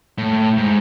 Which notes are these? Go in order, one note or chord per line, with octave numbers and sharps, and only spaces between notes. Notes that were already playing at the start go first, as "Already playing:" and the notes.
A2
G#2